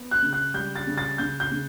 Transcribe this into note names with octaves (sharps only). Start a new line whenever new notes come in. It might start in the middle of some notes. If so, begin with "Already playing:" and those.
Already playing: B3
F#6
C#3
F#6
G3 G6
A6
C#3
A6
C#3 G6
G6
C#3